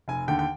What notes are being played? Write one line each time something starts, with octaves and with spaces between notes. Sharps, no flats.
F1 G#5
D#2 D3 G5
G5